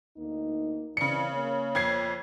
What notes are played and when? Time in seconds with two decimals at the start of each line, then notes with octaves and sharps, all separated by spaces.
0.17 D2 A#3 D#4
0.97 C#3 E3 C4 D5 C#7
1.32 A#3 C#5
1.75 F2 G#6 C7